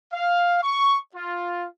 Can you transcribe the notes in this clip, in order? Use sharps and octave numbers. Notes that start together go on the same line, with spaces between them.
F5
C#6
F4